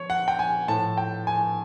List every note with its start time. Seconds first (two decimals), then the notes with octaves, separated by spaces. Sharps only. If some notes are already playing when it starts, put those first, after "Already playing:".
Already playing: F3 C#5
0.10 F#5
0.28 G5
0.39 G#5
0.68 A2 F3 A5
0.97 G5
1.27 G#5